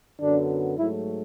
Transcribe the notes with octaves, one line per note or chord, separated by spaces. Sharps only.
F#2 D3 F#3 B3 D4
G#2 F#3 A3 E4